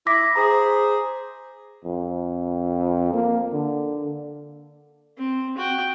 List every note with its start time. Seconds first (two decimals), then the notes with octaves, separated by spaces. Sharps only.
0.07 E4 D6 A#6 B6
0.36 G#4 C5 A#5
1.85 F2
3.14 A#3
3.52 D3
5.18 C4
5.58 F#4 G5